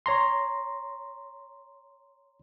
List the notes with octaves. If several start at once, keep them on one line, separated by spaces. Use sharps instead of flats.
C#5 A#5 C6